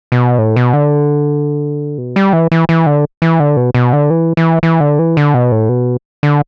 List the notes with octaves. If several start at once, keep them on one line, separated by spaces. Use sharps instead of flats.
B2
A2
B2
D3
B2
G3
E3
E3
E3
D3
E3
D3
B2
B2
D3
E3
E3
E3
D3
E3
D3
B2
A2
B2
D3